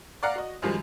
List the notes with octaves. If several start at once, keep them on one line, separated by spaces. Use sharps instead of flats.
D5 F5 F#5 A#5
F#4 D#5
F#2 D#3 F3 G3 G#3